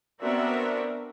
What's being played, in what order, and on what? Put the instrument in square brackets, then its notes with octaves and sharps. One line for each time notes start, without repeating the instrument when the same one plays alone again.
[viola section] B3 C4 D4 F#4 A#4 E5